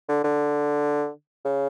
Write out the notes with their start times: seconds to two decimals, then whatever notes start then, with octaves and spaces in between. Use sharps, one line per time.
0.09 D3
0.24 D3
1.45 C#3